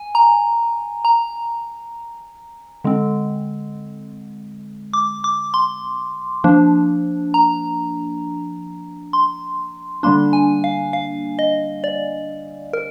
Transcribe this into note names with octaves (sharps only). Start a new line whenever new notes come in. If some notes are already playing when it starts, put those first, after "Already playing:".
Already playing: G#5
A#5
A#5
D3 G#3 C4
D6
D6
C6
F3 A#3 D4
A#5
C6
D3 G3 A#3 D4 C6
G#5
F5
F5
D#5
D5
A#4